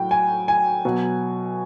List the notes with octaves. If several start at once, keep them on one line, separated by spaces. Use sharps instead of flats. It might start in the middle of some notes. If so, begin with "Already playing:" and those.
Already playing: A2 F#3 G5
G#5
G#5
B2 F#3